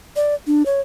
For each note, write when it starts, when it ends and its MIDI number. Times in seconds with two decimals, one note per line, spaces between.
0.16 0.35 74
0.47 0.63 62
0.66 0.80 73